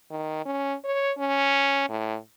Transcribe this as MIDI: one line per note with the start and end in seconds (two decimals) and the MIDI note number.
0.11 0.45 51
0.46 0.75 61
0.85 1.12 73
1.18 1.87 61
1.89 2.17 45